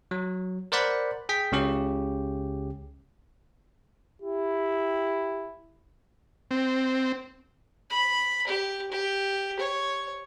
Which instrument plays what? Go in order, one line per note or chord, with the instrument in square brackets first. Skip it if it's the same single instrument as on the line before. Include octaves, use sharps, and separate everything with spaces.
[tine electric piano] F#3
A#4 C5 D5 F#5 B5
G#4 G5 B6
C#2 C#3 C#4 G4
[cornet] E4 [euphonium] G4
[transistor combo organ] C4
[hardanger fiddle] B5
G4
G4
C#5